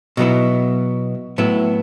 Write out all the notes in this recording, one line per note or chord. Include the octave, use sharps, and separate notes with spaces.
B2 F#3 B3 E4
A2 F#3 B3 E4